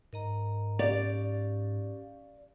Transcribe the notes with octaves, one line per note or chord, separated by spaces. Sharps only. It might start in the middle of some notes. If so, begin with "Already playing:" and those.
G#2 A#4 D#5 A#5
C#4 G4 D5 F5